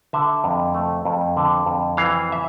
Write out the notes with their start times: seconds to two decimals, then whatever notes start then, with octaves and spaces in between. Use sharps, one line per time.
0.13 D3 E5
0.44 F2
0.74 A3
1.05 F2
1.37 D3
1.66 F2
1.97 E3 F5
2.32 E5